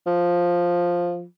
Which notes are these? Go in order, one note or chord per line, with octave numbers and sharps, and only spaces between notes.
F3